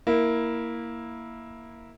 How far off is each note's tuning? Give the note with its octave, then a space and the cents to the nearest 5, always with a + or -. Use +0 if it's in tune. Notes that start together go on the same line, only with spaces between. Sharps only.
A#3 +0 E4 -10